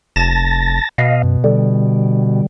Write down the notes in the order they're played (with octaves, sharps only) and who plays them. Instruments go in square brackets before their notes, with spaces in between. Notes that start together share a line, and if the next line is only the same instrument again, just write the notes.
[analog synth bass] F1 [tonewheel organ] A5 A6 A#6
[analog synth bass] B2 [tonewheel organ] D#5 F5
[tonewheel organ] F#2
D3 G3